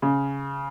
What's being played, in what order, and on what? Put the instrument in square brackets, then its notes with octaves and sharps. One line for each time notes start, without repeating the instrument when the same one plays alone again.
[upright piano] C#3